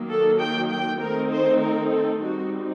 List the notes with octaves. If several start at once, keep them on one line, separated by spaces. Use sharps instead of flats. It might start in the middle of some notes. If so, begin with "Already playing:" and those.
Already playing: D#3 F#3 A#3
A4
G5
G5
D#3 A3 C4 D#4 A#4
C5
A#4
A4
G3 C4 D#4 F#4